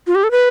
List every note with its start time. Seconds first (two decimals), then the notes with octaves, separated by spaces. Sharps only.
0.07 F4
0.15 G4
0.24 A4
0.31 B4